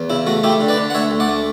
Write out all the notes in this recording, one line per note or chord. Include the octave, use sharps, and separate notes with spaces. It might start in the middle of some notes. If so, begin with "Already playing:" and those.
Already playing: E2
C#3 E4
A3 F#4
A3 E4 G4
D3
B4 D5
D3
F#5
D2 C#5 E5
D2
D5 F#5
A3